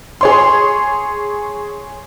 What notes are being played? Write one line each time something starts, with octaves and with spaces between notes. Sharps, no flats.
G#4 C#5 C6